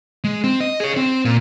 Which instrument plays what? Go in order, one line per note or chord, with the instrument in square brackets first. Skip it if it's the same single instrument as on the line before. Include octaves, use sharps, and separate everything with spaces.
[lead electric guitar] G#3
C4
D#5
G#4 C#5
C4
A#2